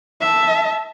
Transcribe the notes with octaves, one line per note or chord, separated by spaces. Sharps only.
E5 A5